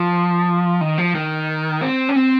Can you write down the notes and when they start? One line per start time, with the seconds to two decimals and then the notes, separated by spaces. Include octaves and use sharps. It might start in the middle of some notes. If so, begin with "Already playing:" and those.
Already playing: F3
0.81 D#3
0.98 F3
1.15 D#3
1.82 C4
2.09 C#4
2.16 C4